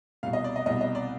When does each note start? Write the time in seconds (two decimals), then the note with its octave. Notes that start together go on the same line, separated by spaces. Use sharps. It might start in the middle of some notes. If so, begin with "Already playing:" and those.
0.23 C2 B2 F5
0.33 D#5
0.44 D5
0.56 D#5
0.66 C2 B2 D#5
0.81 D#5
0.95 D5